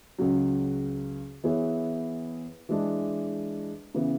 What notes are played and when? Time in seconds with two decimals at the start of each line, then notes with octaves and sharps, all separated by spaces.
0.18 C#2 C#3 F#3
1.44 E3 B3 E4 G#4 C#5
2.69 E3 G#3 D4
3.95 C#3 E3 B3